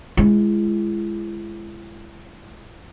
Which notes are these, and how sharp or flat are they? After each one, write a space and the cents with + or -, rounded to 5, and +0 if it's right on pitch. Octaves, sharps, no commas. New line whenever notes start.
G#3 +0 E4 +40